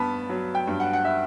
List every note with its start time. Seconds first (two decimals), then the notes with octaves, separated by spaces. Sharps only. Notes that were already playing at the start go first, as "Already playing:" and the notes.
Already playing: G2 B3 A5 B5
0.30 F#3
0.55 G5
0.68 G2
0.80 F#5
0.93 F#5
1.05 E5